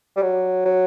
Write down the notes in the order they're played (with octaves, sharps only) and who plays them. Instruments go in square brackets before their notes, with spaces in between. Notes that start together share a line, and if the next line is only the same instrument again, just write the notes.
[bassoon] G3
F#3
F#3